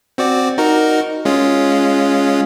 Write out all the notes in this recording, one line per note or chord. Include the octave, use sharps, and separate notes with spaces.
C4 F#4 D5
D#4 F#4 A#4
G#3 C#4 F4